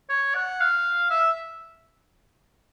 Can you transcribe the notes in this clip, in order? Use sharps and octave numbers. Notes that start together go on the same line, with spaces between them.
C#5
F#5
F5
E5